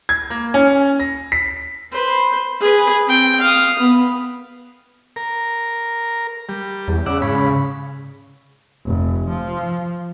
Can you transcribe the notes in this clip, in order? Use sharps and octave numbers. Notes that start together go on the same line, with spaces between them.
G#6
A#3
C#4
A#6
B6
B4 C5
G#4 B4
C4 G5
F5 D#6
B3
A#4
G3
E2
C#3 D5 F#5 E6
G#2 C#4 B5
F1
F3